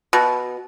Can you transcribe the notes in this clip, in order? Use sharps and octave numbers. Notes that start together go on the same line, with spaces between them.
B2